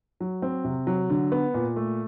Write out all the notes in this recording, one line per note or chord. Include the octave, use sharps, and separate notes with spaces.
F#3
C4
C3
F#3
D3
B3
A#2
A3